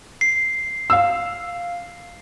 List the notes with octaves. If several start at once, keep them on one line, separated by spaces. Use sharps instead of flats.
C7
F5 E6